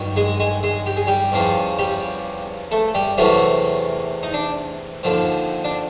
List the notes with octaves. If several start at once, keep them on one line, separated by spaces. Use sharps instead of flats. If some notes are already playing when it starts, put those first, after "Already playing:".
Already playing: G2 D#3 F#3
G#3 G#4
G#3 G#4
G#3 G#4
G4
G#4
G3 G4
E2 C#3 F3
G3 G4
A3 A4
G3 G4
E2 C3 E3 F#3 A3 F#4
D#4
D4
D#2 D3 F3
D4